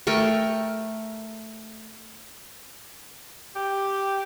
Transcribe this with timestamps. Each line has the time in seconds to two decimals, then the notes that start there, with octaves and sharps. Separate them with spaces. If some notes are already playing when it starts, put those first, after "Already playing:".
0.07 A3 A#4 G5 C#6
3.56 G4